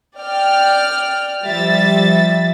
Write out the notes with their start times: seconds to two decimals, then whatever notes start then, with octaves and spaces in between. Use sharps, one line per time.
0.19 D5 G5 F6
1.45 F3 G3 E5 A6